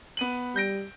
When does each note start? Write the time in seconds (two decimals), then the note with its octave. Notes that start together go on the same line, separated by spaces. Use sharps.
0.17 B3 D#7 F#7
0.56 G3 G6 A#6 D7